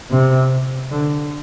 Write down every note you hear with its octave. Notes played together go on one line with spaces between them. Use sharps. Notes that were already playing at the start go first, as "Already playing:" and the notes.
C3
D3